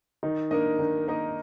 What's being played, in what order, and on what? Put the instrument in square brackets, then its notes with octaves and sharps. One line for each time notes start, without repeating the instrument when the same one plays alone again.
[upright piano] D#3 [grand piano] D#4
[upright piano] A#3 D#4 A#4 D#5 [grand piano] D4
[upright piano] D#3 [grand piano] D4
[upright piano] A#3 D#4 A#4 D#5